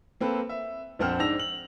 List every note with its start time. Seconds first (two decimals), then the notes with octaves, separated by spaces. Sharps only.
0.20 A#3 C4 A4 B4
0.49 E5
0.99 A#1 F2 C4 C5 F#5 F6
1.19 G#2 D4 E6 A#6 F7
1.39 F#7